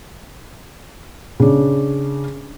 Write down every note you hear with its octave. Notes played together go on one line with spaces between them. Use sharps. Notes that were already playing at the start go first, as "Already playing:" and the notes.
C#3 D4